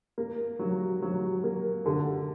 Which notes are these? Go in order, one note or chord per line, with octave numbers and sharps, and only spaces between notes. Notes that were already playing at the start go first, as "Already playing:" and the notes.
A#3
F#3
F#3
A#3
D3